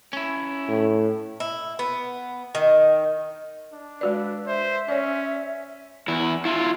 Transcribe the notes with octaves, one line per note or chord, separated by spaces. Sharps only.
C#4 E4
A2
E4
B3
D#3
D4
G#3 F#4 B4 D5
C5 E5
C#4 C#5 D5
E2 E4
E4 F4